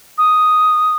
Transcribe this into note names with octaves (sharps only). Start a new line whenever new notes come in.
D#6